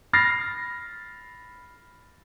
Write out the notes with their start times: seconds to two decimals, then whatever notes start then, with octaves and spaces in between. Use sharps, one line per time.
0.13 B5 F6 A6 A#6 C7